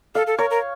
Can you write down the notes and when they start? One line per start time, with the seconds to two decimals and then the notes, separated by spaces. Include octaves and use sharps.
0.15 A4 F5
0.27 A4
0.38 A#4 C#5
0.50 A#4